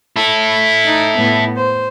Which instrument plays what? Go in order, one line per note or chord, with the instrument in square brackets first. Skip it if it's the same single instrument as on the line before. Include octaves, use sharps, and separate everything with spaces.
[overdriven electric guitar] E4 A4
[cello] D#4
A2 B3
C5